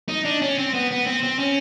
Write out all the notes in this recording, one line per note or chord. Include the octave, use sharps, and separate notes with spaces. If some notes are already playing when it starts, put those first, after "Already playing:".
D#4
D4
C#4
C4
B3
B3
C4
C4
C#4